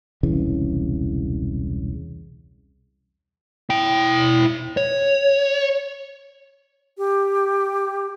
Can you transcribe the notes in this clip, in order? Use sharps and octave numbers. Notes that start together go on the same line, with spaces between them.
E1 C2 C#3 E3
E4 G5
C#5
G4